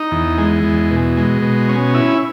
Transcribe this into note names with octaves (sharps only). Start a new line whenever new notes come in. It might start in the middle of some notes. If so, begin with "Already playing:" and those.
Already playing: D#4
E2
G#3
E2
B2
G#3
B2
C#4
E4